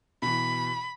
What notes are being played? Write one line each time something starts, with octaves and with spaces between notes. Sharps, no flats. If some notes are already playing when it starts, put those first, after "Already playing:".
B2 E3 B5